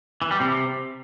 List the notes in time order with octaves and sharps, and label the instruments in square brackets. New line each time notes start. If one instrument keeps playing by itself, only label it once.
[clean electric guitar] E3
G3
C3